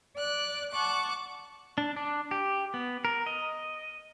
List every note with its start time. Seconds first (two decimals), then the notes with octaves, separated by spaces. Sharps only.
0.17 D5 F#6
0.72 F#5 A5 C#6 D6 F#6
1.78 D4
1.96 D4
2.31 G4
2.74 B3
3.05 A#4
3.26 D#5